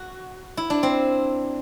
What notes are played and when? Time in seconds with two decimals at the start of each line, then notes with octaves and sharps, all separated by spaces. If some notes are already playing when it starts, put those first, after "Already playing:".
Already playing: F#4
0.57 E4
0.70 D4
0.83 C4